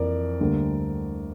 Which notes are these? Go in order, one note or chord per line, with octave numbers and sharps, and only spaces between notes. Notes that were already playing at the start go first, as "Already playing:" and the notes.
Already playing: F2 E3 A#3 A#4 D5
D2 D3 G3 A#3